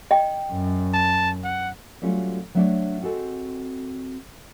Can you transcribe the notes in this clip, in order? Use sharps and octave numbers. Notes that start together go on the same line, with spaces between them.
D#5 G5
F#2
A5
F#5
F#3 G3 A3 C#4 F4
F#3 A3 B3 D4 C#5 D5
C4 F#4 G#4 A4 D#5